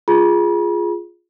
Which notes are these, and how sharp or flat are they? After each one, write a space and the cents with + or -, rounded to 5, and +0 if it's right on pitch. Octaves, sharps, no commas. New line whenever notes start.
F4 +0 G#4 +0 B5 -45